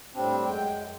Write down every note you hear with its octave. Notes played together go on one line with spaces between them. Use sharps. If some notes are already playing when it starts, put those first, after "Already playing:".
A2 G3 C4 D4
F#2 G#3 G5